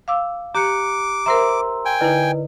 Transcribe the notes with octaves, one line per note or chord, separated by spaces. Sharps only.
F5 D6 E6
G4 A#5 D6 F#6 C#7
A#4 C5 E5 A#5 C6 E6
G5 G#5
D3 D#4 E4 B4 D#5